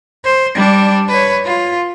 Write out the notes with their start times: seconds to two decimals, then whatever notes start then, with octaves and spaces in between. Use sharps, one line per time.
0.24 C5
0.55 G3 D4
1.09 B4 C#5
1.45 F4